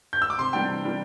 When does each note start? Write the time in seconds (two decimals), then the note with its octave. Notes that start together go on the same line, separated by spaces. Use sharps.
0.13 G6
0.22 E6
0.30 D6
0.39 C3 C6
0.53 E3 G3 D4 G5
0.69 C3
0.84 E3 G3 D4